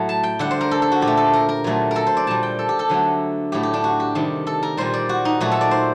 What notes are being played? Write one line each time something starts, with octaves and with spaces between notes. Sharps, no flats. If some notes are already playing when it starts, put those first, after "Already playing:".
Already playing: A2 F#3 A3
A5
G5
D3 G3 F#5
C5
A#4
A4
A4
F#4
A#2 G4
A3
A4
A#4
A#4
A#2 F#3 A3
A4 A#4
C5
D5
A#2 G3 A5
G5
A4
G4
A4
D3 F#3 A3
A2 F#3 A3 G4
G4
D4
F#4
G4
C3 D#3 G3
A4
A#4
A#2 G3 C5
D5
F#4
D#4
A#2 F#3 A3 F#4
A4
D5
C5